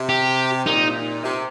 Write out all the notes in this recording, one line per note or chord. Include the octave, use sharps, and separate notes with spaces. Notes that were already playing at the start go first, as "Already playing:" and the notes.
Already playing: C3
G4
A#2 D#4
C3